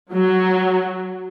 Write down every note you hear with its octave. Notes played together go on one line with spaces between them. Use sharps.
F#3